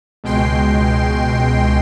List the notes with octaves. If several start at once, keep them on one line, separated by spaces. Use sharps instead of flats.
C#2 B2 G#3 G5 C6 C7